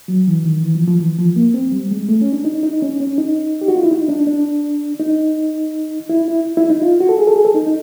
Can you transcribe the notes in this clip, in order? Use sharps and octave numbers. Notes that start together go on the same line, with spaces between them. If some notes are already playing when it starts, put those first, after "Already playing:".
F#3
E3
D#3
E3
F3
F3
E3
F3
A#3
C4
G3
G#3
A3
C#4
D4
D#4
D#4
C#4
C#4
D#4
G4
F#4
F4
E4
D#4
D4
D4
D#4
E4
E4
E4
D#4
F4
F#4
A4
G#4
A4
G#4
A4
D#4
D#4